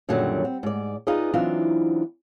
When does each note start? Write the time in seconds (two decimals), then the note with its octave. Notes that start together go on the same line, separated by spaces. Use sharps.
0.09 F#2 A#2 D3 D#3 F#3 G3
0.45 C4
0.63 G#2 D5
1.07 D#4 F4 G#4 B4 D5 D#5
1.33 E3 F#3 C4 D4 D#4 F4